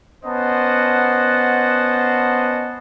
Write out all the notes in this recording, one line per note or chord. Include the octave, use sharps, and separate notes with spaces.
B3 C#4 C5 D#5 F#5 A5